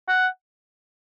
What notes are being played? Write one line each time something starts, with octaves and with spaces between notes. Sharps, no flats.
F#5